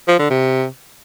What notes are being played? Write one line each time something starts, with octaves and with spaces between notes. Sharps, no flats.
F3
D3
C3